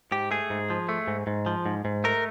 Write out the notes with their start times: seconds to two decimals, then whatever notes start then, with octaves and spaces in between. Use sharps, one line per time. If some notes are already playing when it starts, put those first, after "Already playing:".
0.12 G#2 G4
0.31 A3 G#4
0.50 G#2
0.70 F3
0.89 A3
1.08 G#2
1.27 G#2
1.46 F3
1.66 G#2
1.85 G#2
2.04 A3 A#4